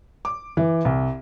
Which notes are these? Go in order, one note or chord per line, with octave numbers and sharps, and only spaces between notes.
D6
E3
C2